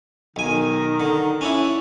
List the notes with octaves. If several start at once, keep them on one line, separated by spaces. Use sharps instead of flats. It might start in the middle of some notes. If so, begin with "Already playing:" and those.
B1 D#3 G#5
D3
C#4 D4 E4